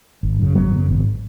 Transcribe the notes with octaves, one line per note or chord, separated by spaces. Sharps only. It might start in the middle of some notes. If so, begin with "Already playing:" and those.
G#1
F#2 C#3
G#1 F#3 B3
F#2 C#3
G#1